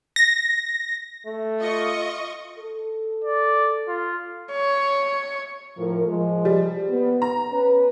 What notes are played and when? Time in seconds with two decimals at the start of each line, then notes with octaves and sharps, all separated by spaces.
0.16 A#6
1.26 A3
1.58 F4 D#5 C#6
2.59 A4
3.24 D5
3.88 F4
4.52 C#5
5.78 A2 F3 A#4
6.07 F3 G#3
6.45 G3
6.90 B3
7.22 A#5
7.52 C#4 B4